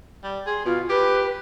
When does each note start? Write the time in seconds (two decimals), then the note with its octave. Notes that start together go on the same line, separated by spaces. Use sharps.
0.24 G3
0.46 G#4 C6
0.65 B2 F4
0.89 G4 B4